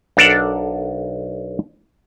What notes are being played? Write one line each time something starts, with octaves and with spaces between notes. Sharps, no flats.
B1 D4 A4 A#4 D5 F#5